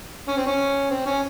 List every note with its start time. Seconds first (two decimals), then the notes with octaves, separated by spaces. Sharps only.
0.28 C#4
0.37 C4
0.47 C#4
0.90 C4
1.06 C#4